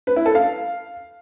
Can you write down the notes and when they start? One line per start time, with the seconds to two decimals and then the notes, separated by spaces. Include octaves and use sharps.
0.07 B4
0.16 E4
0.26 A4
0.35 F5